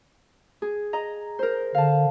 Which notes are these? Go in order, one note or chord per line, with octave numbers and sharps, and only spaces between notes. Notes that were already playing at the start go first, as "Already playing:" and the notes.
G#4
D#5 A#5
A#4 C5
D3 F5 A5